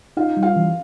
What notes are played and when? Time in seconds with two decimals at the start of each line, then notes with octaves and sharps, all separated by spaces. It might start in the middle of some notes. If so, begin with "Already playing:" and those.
0.17 D#4 F4 F5
0.37 G3
0.42 F4 F5
0.56 E3